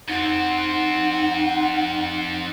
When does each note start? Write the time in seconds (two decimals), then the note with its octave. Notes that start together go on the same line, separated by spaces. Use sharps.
0.08 F2 C4 D#4 F#5